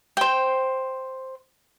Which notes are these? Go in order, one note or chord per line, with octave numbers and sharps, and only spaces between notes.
C5 G5